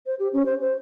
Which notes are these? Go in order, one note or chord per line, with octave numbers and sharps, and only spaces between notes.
C5
G4
C#4
C5
C5